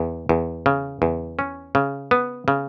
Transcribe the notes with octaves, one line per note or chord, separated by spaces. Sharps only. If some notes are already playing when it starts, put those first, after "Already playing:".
Already playing: E2
E2
C#3
E2
C#4
C#3
B3
C#3